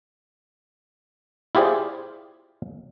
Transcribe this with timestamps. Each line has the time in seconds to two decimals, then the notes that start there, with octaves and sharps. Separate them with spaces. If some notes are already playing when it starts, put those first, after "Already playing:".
1.55 E4 F4 G4 G#4 C5 D5